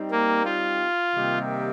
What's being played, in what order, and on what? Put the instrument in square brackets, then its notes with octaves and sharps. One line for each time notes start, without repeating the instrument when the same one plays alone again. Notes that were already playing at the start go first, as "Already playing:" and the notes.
Already playing: [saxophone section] G3 C4 D#4 G4
[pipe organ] A#3
F4
[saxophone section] C3 D#3 G3 A#3 G4